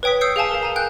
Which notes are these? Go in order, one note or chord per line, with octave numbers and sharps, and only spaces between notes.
B4 C#5 G5 D#6 B6
D#6 E6 G6 C7 C#7
G#4 F5 G#5 A5
A#4 F5
G#5 A#5
G5 F#6 G6